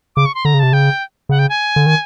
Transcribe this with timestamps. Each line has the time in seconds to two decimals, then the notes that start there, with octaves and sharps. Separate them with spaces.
0.16 C#3 D6
0.25 C#6
0.35 C6
0.45 D3 A#5
0.54 C#3
0.59 C3 A5
0.72 C#3 G5
1.29 C#3 F#5
1.39 G5
1.49 G#5
1.76 D3
1.86 D#3